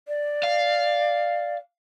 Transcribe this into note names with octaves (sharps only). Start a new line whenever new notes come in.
D5
F5